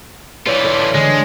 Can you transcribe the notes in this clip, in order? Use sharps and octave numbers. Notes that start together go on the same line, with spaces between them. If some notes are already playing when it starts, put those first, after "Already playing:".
E3 F4 B4 C#5 D5
A4 D5
D3 E3 G#3